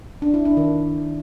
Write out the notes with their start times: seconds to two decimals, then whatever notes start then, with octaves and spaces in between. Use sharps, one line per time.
0.22 D4
0.34 E4
0.45 D4
0.57 D#3